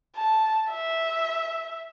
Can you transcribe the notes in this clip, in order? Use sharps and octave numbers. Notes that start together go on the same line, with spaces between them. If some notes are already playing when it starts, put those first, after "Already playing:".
A5
E5